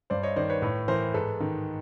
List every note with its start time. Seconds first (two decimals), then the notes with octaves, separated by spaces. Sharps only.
0.10 G2 C5 D5
0.23 C#5 D#5
0.36 D#3 C5 D5
0.50 B4 C#5
0.62 A2 B4 C#5
0.88 E3 A#4 C5
1.14 G#2 A4 B4
1.40 D#3